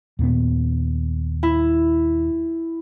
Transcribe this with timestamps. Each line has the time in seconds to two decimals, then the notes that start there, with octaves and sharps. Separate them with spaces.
0.19 D#2 A#2 B3
1.43 E4